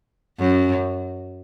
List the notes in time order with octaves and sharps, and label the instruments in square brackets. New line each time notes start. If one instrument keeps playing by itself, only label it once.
[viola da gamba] F#2